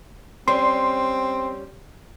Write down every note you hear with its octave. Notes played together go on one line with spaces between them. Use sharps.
G3 C4 C#4 C6